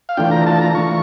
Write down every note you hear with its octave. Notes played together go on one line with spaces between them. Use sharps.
F5
E3 A3 D4 F4 G5
A#5
A5
A#5
E3 A3 D4 F4 C#6